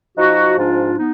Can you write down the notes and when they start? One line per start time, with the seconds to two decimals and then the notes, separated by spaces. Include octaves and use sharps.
0.18 F3 D#4 F#4
0.58 G#2 D4 F4
0.98 B3 D#4